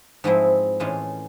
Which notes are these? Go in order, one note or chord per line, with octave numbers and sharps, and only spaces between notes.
G#2 F3 G#3 C4 E4
A2 E3 G#3 C#4 F4